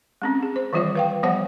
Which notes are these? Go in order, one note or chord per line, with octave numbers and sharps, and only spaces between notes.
G#3 C4 C#4
G#4
C5
D#3 E3 G3 F4 C#5 D5
B4 F5 G5
F3 G3 B3 C5 C#5 F#5